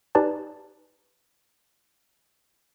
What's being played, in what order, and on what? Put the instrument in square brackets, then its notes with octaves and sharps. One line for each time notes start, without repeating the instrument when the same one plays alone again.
[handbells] D#4 G4 B4 D5 G#5 A5